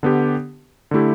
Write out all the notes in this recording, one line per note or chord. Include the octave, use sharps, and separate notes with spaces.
D3 B3 G4
D3 A3 E4 G4